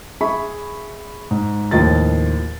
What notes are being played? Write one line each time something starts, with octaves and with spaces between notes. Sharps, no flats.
G#4 E5 B5 C#6
G#2
D#2 A2 F3 D#5 A6